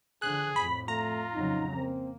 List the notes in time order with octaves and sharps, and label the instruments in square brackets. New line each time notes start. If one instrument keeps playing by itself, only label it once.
[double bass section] D3 F3 [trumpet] G#4 [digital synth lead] F#6
[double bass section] F2 A2 [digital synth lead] B5
[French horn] A3 [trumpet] F4 [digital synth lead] A#5
[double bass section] F2 C#3 F#3 [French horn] D#4
[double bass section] A#3 [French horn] C4